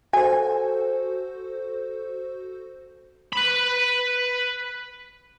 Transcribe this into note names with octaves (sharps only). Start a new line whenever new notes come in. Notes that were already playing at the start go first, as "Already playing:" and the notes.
F#4 A4 C5 G#5
B4 B5